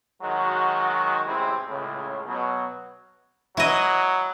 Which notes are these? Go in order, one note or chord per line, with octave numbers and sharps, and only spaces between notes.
D#3 F#3 G#3 F#4
A1 C3 G#3 C4 E4
C#2 A2 C#3
B2 F#3
F#3 E4 D#5